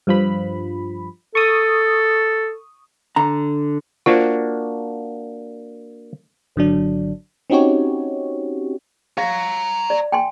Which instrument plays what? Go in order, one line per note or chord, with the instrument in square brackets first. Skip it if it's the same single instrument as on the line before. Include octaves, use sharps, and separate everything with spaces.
[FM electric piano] G2 F3 B5
[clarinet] A4 [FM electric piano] C#6 D#6
[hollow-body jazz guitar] D3 A#5
[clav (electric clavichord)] A#3 D4 F#4 [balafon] F4 C5
[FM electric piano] G#1 D3 F#3 D4
C4 C#4 D#4 F#4 G4 C#5
[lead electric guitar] C#5 A#5 [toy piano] F5
[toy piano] D5
G5 G#5 C6